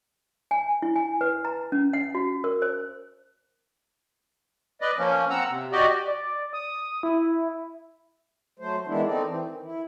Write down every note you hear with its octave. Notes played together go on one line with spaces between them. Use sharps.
G#5
E4
G#5
B4
A#5
C#4
F#5
F#4
A#4
C5
B4 D5 D#5
F3 A#3 C#4
C4 F#5 A#5 E6
C3
F#4 G4 D5 D#5
D5
D#6
E4
F#3 A3 C5
D#3 E3 G#3 B3 D4 E4
A3 C4 D#4 D5
E3 C4
D#3
E4